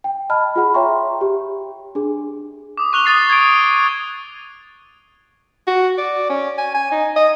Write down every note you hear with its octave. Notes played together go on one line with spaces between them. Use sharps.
G5
D#5 A5 B5 F6
F4 G#4 F#5 B5
C#5 E5 G5 A#5 C6 C#6
G4
D4 G#4
D6 D#6
C#6 F#6 F7 G7
C#6 D#6 A6 C7
G#6 D7
D#7
F#4
D5
C#4
G#5
G#5
D#4
D#5